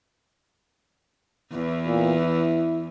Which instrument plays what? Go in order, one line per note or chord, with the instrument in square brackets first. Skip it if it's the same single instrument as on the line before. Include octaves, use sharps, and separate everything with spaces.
[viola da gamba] E2 E3
[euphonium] A#2
E4